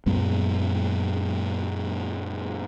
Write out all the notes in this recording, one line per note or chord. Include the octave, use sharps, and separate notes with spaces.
F#2 A#2 G#3 B3